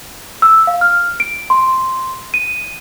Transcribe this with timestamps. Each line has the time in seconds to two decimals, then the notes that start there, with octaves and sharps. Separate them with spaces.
0.42 E6
0.67 F5
0.81 F6
1.20 D7
1.50 C6
2.34 D#7